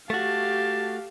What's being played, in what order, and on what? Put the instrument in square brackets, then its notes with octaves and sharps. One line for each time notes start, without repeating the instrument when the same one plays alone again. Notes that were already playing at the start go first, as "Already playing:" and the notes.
[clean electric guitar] A3 F#4 [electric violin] G4 F5 [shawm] A5